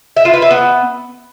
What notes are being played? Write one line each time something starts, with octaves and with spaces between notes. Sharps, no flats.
E5
F4
B4
E5
B3